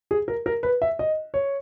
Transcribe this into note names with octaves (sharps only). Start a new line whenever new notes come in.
G#4
A#4
A#4
B4
E5
D#5
C#5